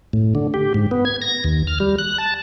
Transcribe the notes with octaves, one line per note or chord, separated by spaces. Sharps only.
A2
D3
G4
G#2
B3
G#6
A#6
D#2
F6
G3
F#6
A5